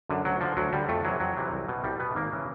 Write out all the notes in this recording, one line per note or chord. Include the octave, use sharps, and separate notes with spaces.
F#2 D3
D2 F#3
D3 F3
D2 F#3
D3 G3
F2 A3
C3 E3 F#3
F2 F#3
C3 E3
C2
B2
C2 G3
B2 B3
G#1 A#3
C#3 E3